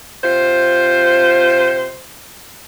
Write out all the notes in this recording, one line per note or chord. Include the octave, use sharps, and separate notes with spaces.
C3 F4 C5